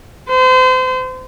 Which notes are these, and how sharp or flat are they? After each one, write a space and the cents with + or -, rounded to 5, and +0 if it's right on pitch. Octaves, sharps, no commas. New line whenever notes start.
C5 -35